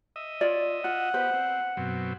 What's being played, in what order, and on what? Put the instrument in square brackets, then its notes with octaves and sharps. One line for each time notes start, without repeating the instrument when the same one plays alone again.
[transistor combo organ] D#5 E5
[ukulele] F4 C#5 D5
[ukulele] F4 [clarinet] F#5
[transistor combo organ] B3 G4 [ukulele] B4 C5
[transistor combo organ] C4
F#2 B2 C4